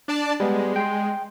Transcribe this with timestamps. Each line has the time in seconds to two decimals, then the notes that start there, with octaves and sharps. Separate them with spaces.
0.08 D4 D5 A5
0.40 G3 G#3 B3
0.76 G5 C6